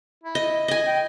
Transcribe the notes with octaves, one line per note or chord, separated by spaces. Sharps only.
E4
D#5
D#5 G#5
G5